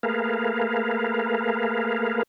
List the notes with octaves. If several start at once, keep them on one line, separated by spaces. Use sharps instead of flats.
A3 A#3 G#4 A#4 B4 F5